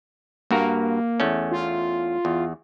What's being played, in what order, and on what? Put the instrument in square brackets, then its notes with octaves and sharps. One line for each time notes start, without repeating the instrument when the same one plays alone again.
[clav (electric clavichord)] G2 F#4 A#4 [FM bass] A#3
[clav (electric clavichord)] E2 A3 C#4
[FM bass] F4
[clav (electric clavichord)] E2